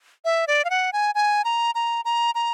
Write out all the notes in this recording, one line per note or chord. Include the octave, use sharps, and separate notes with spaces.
E5
D5
F5
F#5
G#5
G#5
A#5
A#5
A#5
A#5